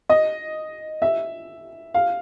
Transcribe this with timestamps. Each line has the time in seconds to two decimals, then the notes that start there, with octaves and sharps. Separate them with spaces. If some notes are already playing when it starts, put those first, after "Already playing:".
0.10 D#5
1.02 E5
1.94 F5